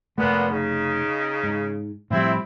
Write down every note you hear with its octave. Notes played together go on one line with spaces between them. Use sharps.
F1 C#2 A#2 A3 B3
C#3 D#4
G#2
A2 F3 G3 C4 E4